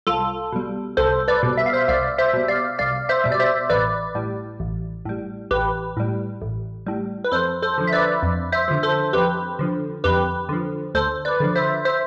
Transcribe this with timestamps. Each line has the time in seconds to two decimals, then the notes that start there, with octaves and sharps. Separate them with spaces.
0.07 C2 F4 A4
0.52 B2 G3
0.97 C2 A4 C5
1.28 B4 D5
1.43 B2 G3
1.57 E5
1.66 F5
1.73 C5 E5
1.88 C2 D5 F5
2.18 C5 E5
2.34 B2 G3
2.48 D5 F5
2.79 C2 D5 F5
3.09 C5 E5
3.24 B2 G3
3.32 D5
3.40 C5 E5
3.70 A1 B4 D5
4.15 A2 G3
4.60 A1
5.05 A2 G3
5.51 A1 G4 B4
5.97 A2 G3
6.42 A1
6.86 A2 G3
7.24 B4
7.32 F2 A4 C5
7.62 A4 C5
7.78 D3 F3
7.87 E5
7.93 B4 D5
8.23 F2
8.52 C5 E5
8.68 D3 F3
8.83 A4 C5
9.13 F2 G4 B4
9.59 D3 F3
10.04 F2 G4 B4
10.49 D3 F3
10.95 D2 A4 C5
11.25 B4 D5
11.40 D3 F3
11.55 C5 E5
11.85 C5 E5